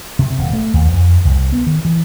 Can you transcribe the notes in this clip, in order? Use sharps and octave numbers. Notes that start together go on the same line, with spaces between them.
C3
D#1
A3
D#2
F2
C2
B3
D#3
E3